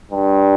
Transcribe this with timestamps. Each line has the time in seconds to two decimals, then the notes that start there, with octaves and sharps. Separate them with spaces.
0.11 G2